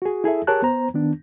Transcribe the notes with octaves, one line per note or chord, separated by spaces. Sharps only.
F#4 G#4
E4 G#4 A4 E5
G4 G#4 A#4 C#5 A5 F#6
B3 C5 A#5
D#3 B3 D4